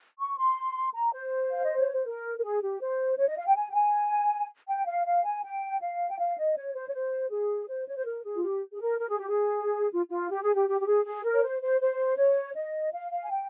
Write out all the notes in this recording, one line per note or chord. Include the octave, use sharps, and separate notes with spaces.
C#6
C6
A#5
C5
F5
D#5
C#5
C5
A#4
A#4
G#4
G4
C5
C#5
D#5
F5
G5
G#5
G5
G#5
G5
F5
F5
G#5
G5
F5
G5
F5
D#5
C#5
C5
C#5
C5
G#4
C5
C#5
C5
A#4
G#4
F4
G4
G#4
A#4
A#4
G#4
G4
G#4
F4
F4
G4
G#4
G4
G4
G4
G#4
G#4
A#4
C#5
C5
C5
C5
C#5
D#5
F5
F5
G#5
G5